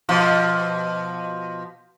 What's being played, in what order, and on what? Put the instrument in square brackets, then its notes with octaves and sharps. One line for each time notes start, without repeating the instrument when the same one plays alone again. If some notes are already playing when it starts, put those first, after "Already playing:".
[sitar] B2 F3